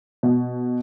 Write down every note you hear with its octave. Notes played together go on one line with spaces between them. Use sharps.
B2